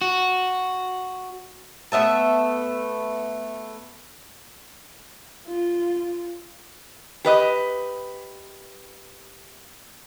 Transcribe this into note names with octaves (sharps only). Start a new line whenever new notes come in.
F#4
A3 B3 E5 A5
F4
G4 B4 D#5